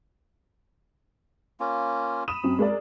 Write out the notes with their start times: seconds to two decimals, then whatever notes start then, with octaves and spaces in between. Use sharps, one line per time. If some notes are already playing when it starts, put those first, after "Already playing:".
1.60 A#3 C#4 F4
2.28 B5 D#6 D#7 E7
2.44 F#2 C4
2.59 G#3 A#4 D5